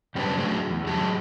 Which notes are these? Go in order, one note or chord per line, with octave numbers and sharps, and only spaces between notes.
F#2 G3 C4 C#4 B4 A5
D3 F#3 A3 G#4
E2
A2 F#3 G4 G#4 A5